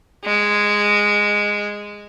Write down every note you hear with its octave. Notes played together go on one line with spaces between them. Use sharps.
G#3